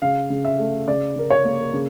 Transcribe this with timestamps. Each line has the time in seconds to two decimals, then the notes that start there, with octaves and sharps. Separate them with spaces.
0.02 C#3 F5
0.30 C#3
0.45 E5
0.59 A3
0.88 C#3 D5
1.16 C#3 A#4
1.30 C#5
1.45 A#3
1.73 C#3